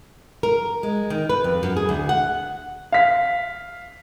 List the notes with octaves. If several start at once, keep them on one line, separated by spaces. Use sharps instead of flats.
A#4
G#3
D#3
B4
F2
F#2
G#4
D2
F#5
F5 B6